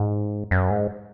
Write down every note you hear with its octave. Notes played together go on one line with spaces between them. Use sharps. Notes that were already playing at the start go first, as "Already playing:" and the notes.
Already playing: G#2
F#2
G#2